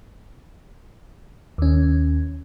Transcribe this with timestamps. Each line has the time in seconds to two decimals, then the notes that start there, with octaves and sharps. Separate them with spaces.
1.58 D#2 C#4